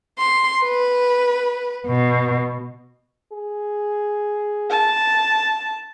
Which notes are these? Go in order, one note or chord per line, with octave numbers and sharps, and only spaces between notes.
C6
B4
B2
G#4
A5